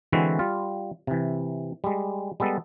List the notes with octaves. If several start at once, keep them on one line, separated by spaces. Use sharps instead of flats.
D3 E3 G#3 C4 E4 F#4
G3 F4
C3 E3
G3 G#3
G3 G#3 B3 A4